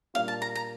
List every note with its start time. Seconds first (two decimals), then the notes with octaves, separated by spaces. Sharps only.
0.14 A#2 G3 A#3 D4 F4 F5
0.28 A5
0.42 A#5
0.55 A#5